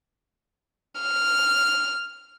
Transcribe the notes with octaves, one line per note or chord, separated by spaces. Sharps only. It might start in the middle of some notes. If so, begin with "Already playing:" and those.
F6